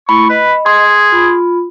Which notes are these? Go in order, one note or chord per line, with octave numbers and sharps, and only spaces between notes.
A3 E4 B5 C#6
B4 D#5
G#4 C6
F4 B5